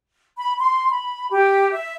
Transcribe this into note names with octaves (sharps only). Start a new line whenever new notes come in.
B5
C6
B5
G4
E5